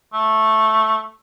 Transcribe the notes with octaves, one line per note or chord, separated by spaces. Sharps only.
A3